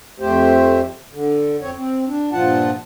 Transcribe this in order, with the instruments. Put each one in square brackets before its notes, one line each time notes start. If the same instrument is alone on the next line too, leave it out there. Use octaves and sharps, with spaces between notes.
[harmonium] F2 A3 G4 C5
D3
F2 C4 C#5
C4
D4
G2 A#2 F3 F4 F#5 A5